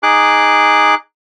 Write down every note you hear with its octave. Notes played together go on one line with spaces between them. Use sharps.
D#4 G#4 D6 F#6